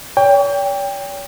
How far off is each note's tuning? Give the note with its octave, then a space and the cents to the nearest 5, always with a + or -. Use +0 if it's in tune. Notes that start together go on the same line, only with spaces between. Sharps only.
C#5 +45 G5 +20